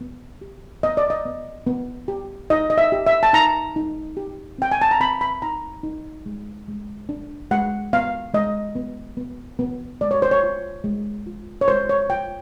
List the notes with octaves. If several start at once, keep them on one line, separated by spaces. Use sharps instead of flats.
B3
G4
B3 D#5
D5
D#5
B3
B3
G4
D#4 D#5
D#5
E5
G4
E5
A5
D#4 A#5
D#4
G4
C4 G5
G#5
A5
A#5
C4 B5
B5
D#4 A#5
D#4
G#3
G#3
D4
G#3 F#5
B3 F5
G#3 D#5
B3
B3
B3
G#3 D5
C#5
C5
C#5
F4
G#3
F4
C#5
G#3 C5
C#5
F4 G5